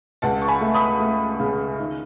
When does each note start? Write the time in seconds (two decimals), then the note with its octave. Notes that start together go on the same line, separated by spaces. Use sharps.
0.22 C#2 F#5 A5
0.42 C#6
0.48 G#5 B5
0.61 A3
0.74 B5 D#6
1.00 A3
1.40 C#3
1.79 D#3